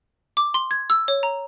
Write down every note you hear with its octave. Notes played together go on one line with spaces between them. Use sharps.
D6
C6
G#6
E6
C#5
A#5